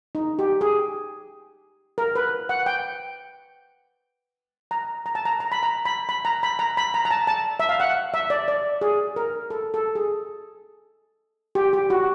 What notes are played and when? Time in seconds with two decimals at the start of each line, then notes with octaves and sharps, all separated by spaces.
0.15 D#4
0.39 G4
0.61 G#4
1.98 A#4
2.15 B4
2.49 F#5
2.66 G5
4.71 A#5
5.06 A#5
5.15 A5
5.25 A#5
5.40 A#5
5.52 B5
5.63 A#5
5.85 B5
6.09 B5
6.25 A#5
6.43 B5
6.59 A#5
6.77 B5
6.94 A#5
7.05 A#5
7.11 A5
7.27 A5
7.60 E5
7.69 F5
7.80 F#5
8.14 E5
8.30 D5
8.48 D5
8.81 G#4
9.16 A#4
9.50 A4
9.74 A4
9.95 G#4
11.55 G4
11.73 G4
11.90 F#4